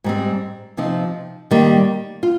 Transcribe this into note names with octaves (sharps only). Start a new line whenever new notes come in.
G#2 G3 C4
C3 F3 C4 D#4
D#3 G3 A#3
F4